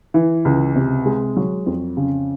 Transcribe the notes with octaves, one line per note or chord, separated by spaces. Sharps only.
E3
C#2
C3
G#3
F#3
F2
C#3